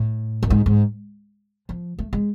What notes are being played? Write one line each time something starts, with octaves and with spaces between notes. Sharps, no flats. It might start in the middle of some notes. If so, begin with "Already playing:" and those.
Already playing: A2
F#2
G#2
G#2
F3
A3
G#3